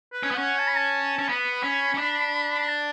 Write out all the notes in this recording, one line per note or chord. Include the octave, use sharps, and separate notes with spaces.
B4
C#4
B3
C#4 F#5
A5
B5
A5
C#4
B3 B5
C#4
C#4
D4
B5
A5